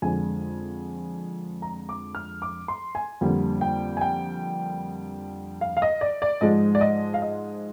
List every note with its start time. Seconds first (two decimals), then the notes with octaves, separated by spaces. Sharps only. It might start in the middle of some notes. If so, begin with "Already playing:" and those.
0.02 F2 D3 G#3 G#5
1.62 A#5
1.89 D6
2.15 F6
2.42 D6
2.68 C6
2.95 G#5
3.21 F2 D3 G3 A#3
3.61 G5
3.97 G#5
4.01 G5
5.61 F5
5.77 F5
5.82 D#5
6.01 D5
6.22 D5
6.41 G#2 F3 G#3 D#5
6.75 D5
6.81 D#5
7.14 F5
7.22 D#5